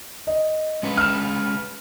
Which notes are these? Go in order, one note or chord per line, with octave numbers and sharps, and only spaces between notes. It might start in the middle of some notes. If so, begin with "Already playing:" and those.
D#5
G#3 C#4 B4
F6 E7